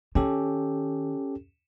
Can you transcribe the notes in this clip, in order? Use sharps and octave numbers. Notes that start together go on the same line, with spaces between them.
D#3 C#4 G4 A4